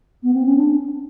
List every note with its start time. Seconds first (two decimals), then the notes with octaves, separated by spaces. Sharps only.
0.23 B3
0.34 C4
0.46 C#4
0.57 D4